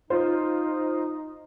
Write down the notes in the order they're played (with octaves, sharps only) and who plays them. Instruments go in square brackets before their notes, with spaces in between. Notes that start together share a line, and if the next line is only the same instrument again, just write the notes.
[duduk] D#4 [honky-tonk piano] F4 C5